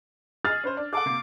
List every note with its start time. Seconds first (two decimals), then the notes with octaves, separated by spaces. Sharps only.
0.45 G#4 D#5 F6 A6
0.64 C#4 B4 C5
0.77 D4
0.93 G#4 A4 F#5 D6
1.06 C3 A#3 C7